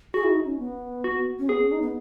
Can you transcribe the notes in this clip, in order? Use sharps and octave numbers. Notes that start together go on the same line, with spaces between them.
F#4 G#4
E4
D#4
C#4
B3
F#4
C#4
B3 G#4
C#4
D#4
B3